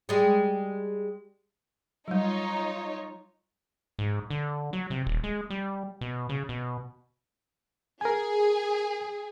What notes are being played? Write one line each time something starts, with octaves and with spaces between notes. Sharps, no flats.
G3 G#3
F#3 G3 D#4 F4 C#5
G#2
D3
F#3
C3
D#1
G#3
G3
B2
C#3
B2
G#4 A#4 G#5